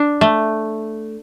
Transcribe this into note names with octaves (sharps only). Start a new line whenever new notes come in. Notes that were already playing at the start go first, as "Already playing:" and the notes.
Already playing: D4
A3